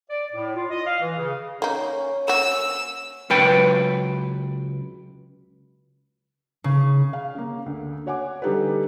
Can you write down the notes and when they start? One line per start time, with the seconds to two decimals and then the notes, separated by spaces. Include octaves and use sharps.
0.09 D5
0.33 A2
0.56 F4
0.70 D#5
0.85 F5
1.01 E3
1.16 C#3
1.62 A#3 C#4 D#4
2.28 A#3 F#4 E6
3.30 C#2 F#3 B4 G5
6.64 C#3
7.13 F5
7.35 C#3 A#3
7.66 D2
8.06 F#4 C#5 F#5 G#5 D6
8.42 D3 G3 D#4 G4 A4 B4